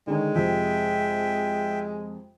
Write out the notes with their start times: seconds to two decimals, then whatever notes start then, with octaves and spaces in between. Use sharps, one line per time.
0.07 D3 D#3 G#3 C#4
0.35 F2 C3 E5 G5